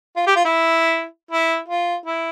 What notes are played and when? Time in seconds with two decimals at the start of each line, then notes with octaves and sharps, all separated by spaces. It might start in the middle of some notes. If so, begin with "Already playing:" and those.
0.16 F4
0.27 G4
0.36 F4
0.45 E4
1.31 E4
1.68 F4
2.06 E4